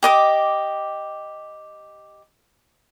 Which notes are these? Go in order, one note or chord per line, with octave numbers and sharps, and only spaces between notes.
G4 D#5 D6